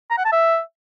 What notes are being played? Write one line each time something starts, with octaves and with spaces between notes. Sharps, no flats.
A#5
F#5
A5
E5